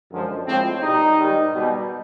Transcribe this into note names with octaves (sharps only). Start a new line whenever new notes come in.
F#2 D3 F3 G#3
A2 F3 G#3 C4
B2 G3 D#4
G#2 D#3 G3
B2 G3